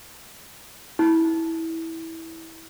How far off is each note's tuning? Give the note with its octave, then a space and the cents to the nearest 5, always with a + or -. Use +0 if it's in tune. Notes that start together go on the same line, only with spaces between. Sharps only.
E4 -15